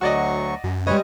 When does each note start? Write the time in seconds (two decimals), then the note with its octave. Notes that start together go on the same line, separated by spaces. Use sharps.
0.01 D2 F#3 F#4 D5 D#5 C#6
0.64 F#2
0.87 G3 G#3 B4 C#5 D#5